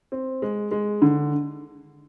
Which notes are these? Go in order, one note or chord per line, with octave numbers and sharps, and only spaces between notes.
C4
G#3
G#3
D3